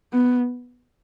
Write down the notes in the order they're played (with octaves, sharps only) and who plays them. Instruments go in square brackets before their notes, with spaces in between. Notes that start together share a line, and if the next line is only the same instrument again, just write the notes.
[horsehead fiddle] B3